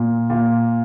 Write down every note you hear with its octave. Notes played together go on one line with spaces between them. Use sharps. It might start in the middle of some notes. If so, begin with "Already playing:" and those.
Already playing: A#2
A#2